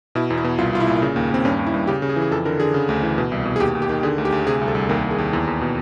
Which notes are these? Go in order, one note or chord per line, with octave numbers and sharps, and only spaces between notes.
B2 E4
E2
E4
B2
C2 F4
C2 F4
E4
A#2
C#3
D#2
D#2 C4
G2 C#4
G2
E4
G2
C#3 G4
C#3
G#4
E3
G#4
F2 A4
D3 A#4
D3 G#4
C#3
D2
E3
B2
C2
B2
G#4
D#2 G4
D#2
G4
D#3
D3 G#4
D2
G4
D2
C3 G#4
C2
A4
C2
D#2 A#4
D#2
G#4
D#2
E2
E2
B2